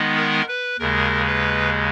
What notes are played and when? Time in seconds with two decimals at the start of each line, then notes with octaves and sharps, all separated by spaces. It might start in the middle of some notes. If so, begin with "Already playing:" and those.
Already playing: D#3 G#3 B3 D#4
0.17 A#4
0.48 B4
0.79 D#2 C#3 G#3 A#4
1.27 B4